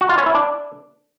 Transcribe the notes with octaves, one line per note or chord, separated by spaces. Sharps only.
F#4
F4
C#4
E4
D4